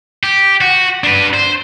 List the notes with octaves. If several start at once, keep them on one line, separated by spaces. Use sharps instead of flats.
G4
F#4
D4 B4
C5